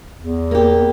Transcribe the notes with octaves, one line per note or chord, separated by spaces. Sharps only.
E2
A#3 G4